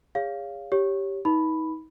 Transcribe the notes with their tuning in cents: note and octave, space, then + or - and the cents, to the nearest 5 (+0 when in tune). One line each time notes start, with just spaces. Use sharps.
G#4 -35 C#5 +20 F5 -5
G4 +0 C#5 +0
D#4 +35 B4 -15 B5 +0